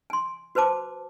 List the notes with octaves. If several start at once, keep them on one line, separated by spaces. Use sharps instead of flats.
G#5 C6
F#4 B4 C5 A5 D6